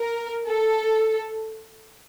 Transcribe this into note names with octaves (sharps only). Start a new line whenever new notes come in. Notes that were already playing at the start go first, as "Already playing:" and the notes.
Already playing: A#4
A4